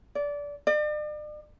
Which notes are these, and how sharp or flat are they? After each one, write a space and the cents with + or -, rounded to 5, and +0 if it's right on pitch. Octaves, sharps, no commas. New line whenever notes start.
D5 -20
D5 +40